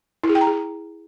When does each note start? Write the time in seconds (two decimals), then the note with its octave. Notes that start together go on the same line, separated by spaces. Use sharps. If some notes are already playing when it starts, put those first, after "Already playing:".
0.24 E4
0.29 G#4
0.35 G5
0.41 A#5
0.47 G#4